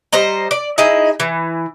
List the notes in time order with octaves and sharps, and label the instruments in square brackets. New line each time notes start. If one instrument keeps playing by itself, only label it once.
[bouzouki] G3 C5 D#5 A#5
D5
D#4 E4 G#4 D#5
E3